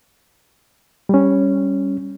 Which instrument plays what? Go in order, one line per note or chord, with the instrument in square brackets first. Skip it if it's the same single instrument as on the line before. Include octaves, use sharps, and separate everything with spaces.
[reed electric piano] G3 C#4